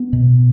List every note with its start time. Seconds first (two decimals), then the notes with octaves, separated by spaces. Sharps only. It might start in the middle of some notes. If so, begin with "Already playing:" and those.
Already playing: B3
0.13 B2